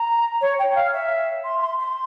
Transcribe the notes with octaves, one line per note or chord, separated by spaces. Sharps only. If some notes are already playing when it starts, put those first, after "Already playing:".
Already playing: A#5
C#5
G5
F5
E5
C6
C6
C6